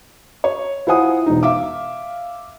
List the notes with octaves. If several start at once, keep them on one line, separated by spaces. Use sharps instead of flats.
C#5
E4 F4 C5 F#5 G#5 D#6
E1 D#4
E5 F5 D6